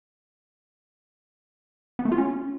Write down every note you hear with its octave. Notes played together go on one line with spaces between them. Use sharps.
B3
A3
F4
C#4